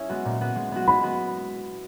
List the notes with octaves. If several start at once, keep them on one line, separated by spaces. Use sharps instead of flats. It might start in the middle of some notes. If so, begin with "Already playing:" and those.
Already playing: C#4 E4 G#4
G#3 B3 F#4
A#2
G#3 B3 F#4
G#3
B3 F#4
G#3 B5
B3 F#4